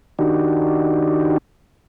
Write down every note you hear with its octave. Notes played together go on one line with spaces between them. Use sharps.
D#3 D4 D#4 F#4 G4